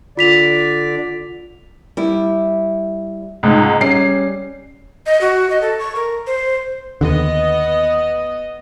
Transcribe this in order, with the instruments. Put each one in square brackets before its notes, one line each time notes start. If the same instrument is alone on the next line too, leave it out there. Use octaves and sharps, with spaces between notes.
[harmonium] D3 D5 [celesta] F4 B6 F7
[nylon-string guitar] G3 E4
[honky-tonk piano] C#2 G#2
[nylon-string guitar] G3 C#4 [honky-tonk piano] C7
[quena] D#5
F#4
D#5
A4
C#6
A#4
C5
[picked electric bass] D#2 D3 [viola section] B3 D#5